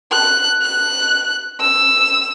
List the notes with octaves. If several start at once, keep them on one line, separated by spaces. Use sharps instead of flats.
F#6
F#6
E6